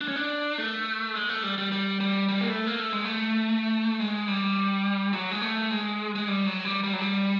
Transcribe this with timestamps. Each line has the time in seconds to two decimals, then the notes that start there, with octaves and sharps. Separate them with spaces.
0.01 D4
0.08 C#4
0.16 D4
0.58 A3
1.15 G#3
1.29 A3
1.43 G3
1.58 G3
1.72 G3
2.01 G3
2.29 G3
2.41 A#3
2.48 A3
2.67 A#3
2.79 A3
2.93 G#3
3.05 A3
4.00 G#3
4.28 G3
5.13 F#3
5.31 G#3
5.42 A3
5.70 G#3
6.15 G#3
6.28 G3
6.46 F#3
6.65 G3
6.84 G3
6.93 F#3
7.01 G3